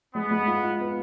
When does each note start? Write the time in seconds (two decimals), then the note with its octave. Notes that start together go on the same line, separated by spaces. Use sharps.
0.15 G#3 B3
0.31 G#3
0.47 F4
0.64 F4
0.80 B3